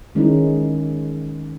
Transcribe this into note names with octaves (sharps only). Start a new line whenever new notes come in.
D#3 G#3 C#4 D#4 E4